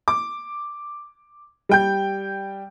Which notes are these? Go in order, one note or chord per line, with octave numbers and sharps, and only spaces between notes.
D6
G3 G5 G6